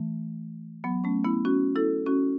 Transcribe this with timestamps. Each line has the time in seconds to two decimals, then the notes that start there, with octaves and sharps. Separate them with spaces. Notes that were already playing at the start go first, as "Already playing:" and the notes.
Already playing: E3 A3
0.84 F#3 B3
1.04 A3 C#4
1.25 B3 E4
1.45 C#4 F#4
1.76 E4 A4
2.06 C#4 F#4